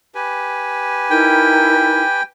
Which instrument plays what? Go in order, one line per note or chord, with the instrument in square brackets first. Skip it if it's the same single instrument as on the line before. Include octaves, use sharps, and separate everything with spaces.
[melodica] G4 B4 G#5
[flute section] D#4 E4 A#4 [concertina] G5